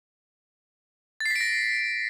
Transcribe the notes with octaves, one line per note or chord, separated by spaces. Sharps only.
A6
C7
B6
D7
A#6